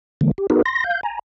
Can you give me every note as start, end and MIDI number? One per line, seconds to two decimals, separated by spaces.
0.21 0.31 50
0.21 0.31 52
0.21 0.31 56
0.21 0.31 58
0.38 0.47 67
0.50 0.62 59
0.50 0.62 63
0.50 0.62 66
0.50 0.62 68
0.50 0.62 70
0.50 0.62 71
0.66 0.84 84
0.66 0.84 94
0.84 1.01 77
0.84 1.01 91
1.03 1.19 80
1.03 1.19 82